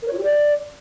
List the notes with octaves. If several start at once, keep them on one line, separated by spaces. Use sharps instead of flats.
A#4
C#5
F4
G4
D5